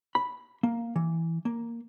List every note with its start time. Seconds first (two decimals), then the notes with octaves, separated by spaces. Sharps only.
0.15 B5
0.63 A#3
0.96 E3
1.45 A#3